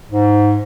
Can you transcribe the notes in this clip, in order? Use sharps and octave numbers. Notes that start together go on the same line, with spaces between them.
G#2